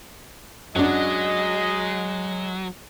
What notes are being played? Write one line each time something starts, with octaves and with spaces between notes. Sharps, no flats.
F#2 F#3 G#3 D4 D#5